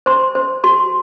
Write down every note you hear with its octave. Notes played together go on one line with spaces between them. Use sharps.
C5 C6
C5
F#4 C6